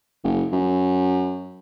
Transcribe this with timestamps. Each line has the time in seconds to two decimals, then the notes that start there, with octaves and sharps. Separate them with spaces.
0.24 F#1
0.53 F#2